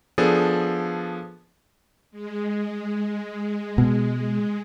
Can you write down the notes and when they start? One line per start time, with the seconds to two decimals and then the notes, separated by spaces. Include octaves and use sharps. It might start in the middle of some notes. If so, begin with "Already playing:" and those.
0.18 F3 B3 D4 G#4 A4
2.11 G#3
3.78 B2